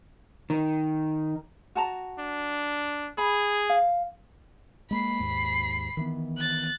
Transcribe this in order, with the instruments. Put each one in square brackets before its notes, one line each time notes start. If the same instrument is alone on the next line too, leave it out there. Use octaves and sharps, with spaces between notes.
[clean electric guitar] D#3
[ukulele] F#4 A5 A#5
[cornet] D4
[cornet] G#4 [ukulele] B5
[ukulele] F5
[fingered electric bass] G#3 A#3 [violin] B5 C7
[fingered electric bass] D#2 G#2
D#3 E3 B3
[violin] F#6 A6